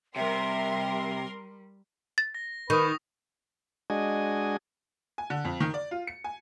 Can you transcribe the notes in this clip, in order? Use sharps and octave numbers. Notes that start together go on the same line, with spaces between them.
C3 G3 A#4 E5 C6
A6
A#6
D#3 B4 C#6 D#6
G#3 D4 F#4 D#5 G#5
G#5
D3
F2
D#3
D5
F4
C#7
G#5